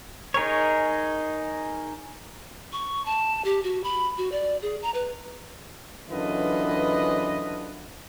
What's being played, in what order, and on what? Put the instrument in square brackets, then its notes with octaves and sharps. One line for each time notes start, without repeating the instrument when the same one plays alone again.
[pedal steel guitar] D#4 G#4 A#4 C#5
[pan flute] C#6
A5
G4
F#4
B5
F#4
D5
G#4
A#5
B4
[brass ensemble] F#2 D3 E3 F4 B4 D#5